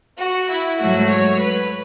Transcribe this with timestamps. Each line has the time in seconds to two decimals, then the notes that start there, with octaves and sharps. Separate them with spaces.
0.19 F#4
0.49 E4
0.79 G#2 F#3 A3 F#4
1.09 C#5
1.39 B4